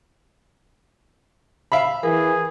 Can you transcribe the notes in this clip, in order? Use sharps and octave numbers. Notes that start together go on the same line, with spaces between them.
E5 F5 B5
E3 G#4 A#4